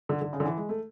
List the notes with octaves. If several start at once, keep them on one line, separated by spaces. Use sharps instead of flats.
D3
D3
C#3
D3
E3
G#3
A3